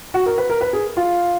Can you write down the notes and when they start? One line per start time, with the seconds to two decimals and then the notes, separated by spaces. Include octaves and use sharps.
0.14 F#4
0.26 A#4
0.38 B4
0.50 A#4
0.61 B4
0.73 G#4
0.97 F4